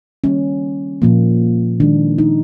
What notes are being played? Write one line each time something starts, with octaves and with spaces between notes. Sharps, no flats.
D#3 G3 A#3 C#4
A#2 F3 A#3
D#3 G#3 D4
D#4